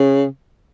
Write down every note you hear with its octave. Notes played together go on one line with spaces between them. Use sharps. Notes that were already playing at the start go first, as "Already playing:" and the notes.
Already playing: C#3